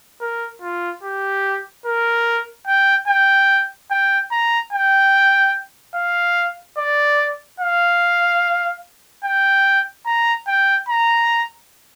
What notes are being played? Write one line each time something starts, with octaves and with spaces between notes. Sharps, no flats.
A#4
F4
G4
A#4
G5
G5
G5
A#5
G5
F5
D5
F5
G5
A#5
G5
A#5